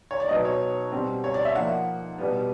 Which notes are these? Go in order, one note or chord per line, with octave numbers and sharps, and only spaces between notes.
C#5
D5
B2 F#3 B3 D#4 D#5
C#5
B2 G3 C4
C#5
D5
E5
F3 A#3 D#4 F#5
B2 G3 B3